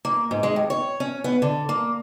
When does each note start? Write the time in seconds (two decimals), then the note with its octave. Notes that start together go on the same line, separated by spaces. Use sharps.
0.05 A#3
0.31 G#2
0.43 G#3
0.56 D#2
0.70 C#5
1.00 C#4
1.24 B3
1.42 D3
1.69 A#3